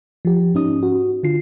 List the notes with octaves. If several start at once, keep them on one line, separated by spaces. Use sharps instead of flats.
F3 G4
G#2 C#4 D#4 D#6
F#4
D3 F4 C7